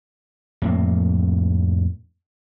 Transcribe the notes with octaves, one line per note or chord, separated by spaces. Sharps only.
F2 A2 A#3